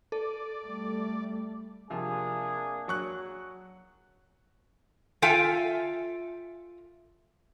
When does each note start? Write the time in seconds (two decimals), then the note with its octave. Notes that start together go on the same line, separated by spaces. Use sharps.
0.12 A4 D5
0.66 G3 A3
1.90 C3 F3 A#3 D4 G#4
2.88 F#3 C#6 F#6
5.22 F4 A4 E5 F5 G5 G#5